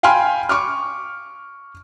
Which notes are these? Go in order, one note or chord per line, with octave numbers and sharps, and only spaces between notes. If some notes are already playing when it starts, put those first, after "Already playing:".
F5 G5 G#5 B5 C6 F6
C#6 D6 F6